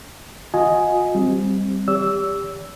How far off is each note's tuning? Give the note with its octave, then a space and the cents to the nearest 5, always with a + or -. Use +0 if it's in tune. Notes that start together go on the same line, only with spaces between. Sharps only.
F4 +45 D#5 +5 G#5 +10
G3 -5 C4 +5
G4 +20 D5 -45 E6 +0